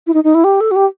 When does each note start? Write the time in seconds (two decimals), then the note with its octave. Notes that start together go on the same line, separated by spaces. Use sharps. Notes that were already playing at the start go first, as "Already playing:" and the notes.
0.07 E4
0.14 D#4
0.24 D#4
0.35 E4
0.44 G4
0.61 A4
0.71 F#4
0.76 G4